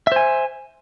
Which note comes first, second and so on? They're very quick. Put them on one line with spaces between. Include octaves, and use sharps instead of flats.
E5 C5 G#5